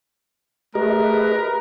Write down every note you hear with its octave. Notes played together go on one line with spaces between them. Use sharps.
A3 G4 G#4 A#4 B4 D#5